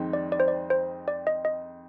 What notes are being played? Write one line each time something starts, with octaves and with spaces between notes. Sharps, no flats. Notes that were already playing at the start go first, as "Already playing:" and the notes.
Already playing: F2 D#3 G#3 C4 D#4
D5
D5
C5
D5
C5
D5
D#5
D#5